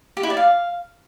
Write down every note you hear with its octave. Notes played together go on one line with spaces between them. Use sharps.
G4
E4
D5
F5